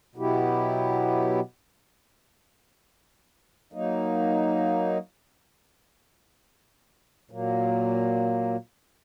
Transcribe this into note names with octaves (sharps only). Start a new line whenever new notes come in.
B2 F#3 B3 E4 G4
F#3 A#3 D#4
A#2 F#3 A#3